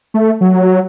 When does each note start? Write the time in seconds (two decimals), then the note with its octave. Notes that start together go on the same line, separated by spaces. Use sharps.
0.14 A3
0.41 F#3